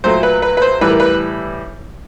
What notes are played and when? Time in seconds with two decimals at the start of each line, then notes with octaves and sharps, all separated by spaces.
0.04 A#2 F#3 A3 C5
0.23 B4
0.42 B4
0.57 B4
0.62 C5
0.81 A2 E3 G3 B4
0.90 A#4
1.00 B4